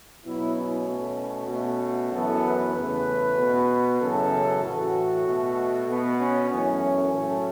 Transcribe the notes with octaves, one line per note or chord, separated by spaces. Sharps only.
B2 F#3 B3 E4
C#4
B2 A3
B2 A3
F#2 E3 B3 A4
B4
E2 C#3 E3 A3 B4
B2 B3
F#2 C#3 E3 A4
A2 E3 A3 F#4
B2 A3
B2 B3
C#4
F#2 E3 A3 C#4
A2 F#3 A3 C#4